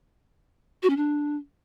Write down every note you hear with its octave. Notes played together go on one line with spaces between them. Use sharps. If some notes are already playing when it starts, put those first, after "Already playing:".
F#4
C#4
D4